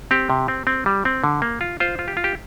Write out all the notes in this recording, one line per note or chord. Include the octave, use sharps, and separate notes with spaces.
C4 G4
C3
C4
C4
G3
C4
D3
A#3
F4
F4 C5
F4
G4
F4
G4